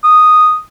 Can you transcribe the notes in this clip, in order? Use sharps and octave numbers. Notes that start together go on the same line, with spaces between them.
D#6